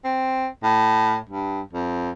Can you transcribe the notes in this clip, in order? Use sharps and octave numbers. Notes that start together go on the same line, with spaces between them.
C4
A2
G2
F2